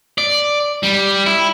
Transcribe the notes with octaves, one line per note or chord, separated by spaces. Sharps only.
D5
G3
E4